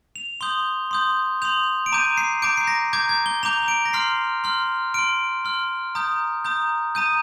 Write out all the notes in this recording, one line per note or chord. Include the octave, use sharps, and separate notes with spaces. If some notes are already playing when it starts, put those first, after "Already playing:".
F7
C6 D#6 G6 G7
C6 D#6 G6
C6 D#6 G6 F7
D7
A#5 D6 G6 D#7
C7
A#5 D6 G6 D7
C7
A#6
A#5 D6 G6 G#6
G#6
G7
A#5 D6 G6 F7
D7
A#6
C6 F6 C7
C6 F6
C6 F6 D7
C6 F6
A#5 D#6 G6
A#5 D#6 G6
A#5 D#6 G6 D#7